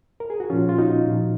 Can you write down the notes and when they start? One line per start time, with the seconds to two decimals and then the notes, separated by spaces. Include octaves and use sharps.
0.20 A#4
0.30 G#4
0.40 F#4
0.50 A#2 F3 C#4 F4
0.69 F4
0.78 D#4 F#4
1.06 A#2 F3